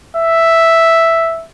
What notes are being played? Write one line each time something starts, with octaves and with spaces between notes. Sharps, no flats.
E5